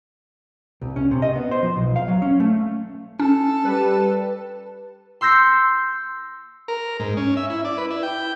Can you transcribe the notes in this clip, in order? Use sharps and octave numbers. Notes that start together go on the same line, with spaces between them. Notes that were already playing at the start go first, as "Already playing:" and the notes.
C2
C#4
C3
D#5
B3
C5
F3
B1
F5
F#3
C#4
A3
C#4 A4
G3 B4
C6 E6 G6 A#6 C7 C#7
A#4
G#2
C#4
E5
E4
D5
B4
E4
G5